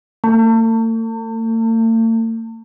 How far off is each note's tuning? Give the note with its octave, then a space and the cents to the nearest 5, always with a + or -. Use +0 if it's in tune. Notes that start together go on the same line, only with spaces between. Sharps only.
A3 +45